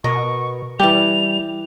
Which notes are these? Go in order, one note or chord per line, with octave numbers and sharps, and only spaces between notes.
B2 A#4 D#5 C#6
E3 G3 G4 A5 F7